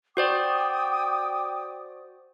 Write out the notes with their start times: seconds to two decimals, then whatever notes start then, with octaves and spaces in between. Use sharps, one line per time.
0.17 F#4 C5 D5 G5 D6 D#6